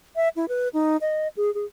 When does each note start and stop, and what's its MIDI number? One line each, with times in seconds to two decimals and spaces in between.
0.16 0.29 76
0.36 0.48 64
0.48 0.68 71
0.74 0.97 63
1.01 1.28 75
1.37 1.53 68
1.54 1.65 68